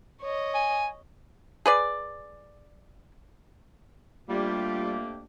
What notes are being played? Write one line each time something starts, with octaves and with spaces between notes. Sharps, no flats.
C#5 D#5
G#5
G#4 B4 D5
F2 G3 A3 A#3 D4 F4 G4